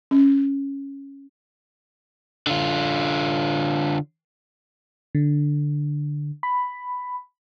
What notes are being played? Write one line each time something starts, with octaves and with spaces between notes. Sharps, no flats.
C#4
D3 F4
D3
B5